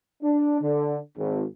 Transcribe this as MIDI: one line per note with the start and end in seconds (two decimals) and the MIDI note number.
0.22 0.59 62
0.61 0.97 50
1.17 1.43 32